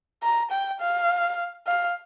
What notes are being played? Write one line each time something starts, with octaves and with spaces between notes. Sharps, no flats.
A#5
G5
F5
F5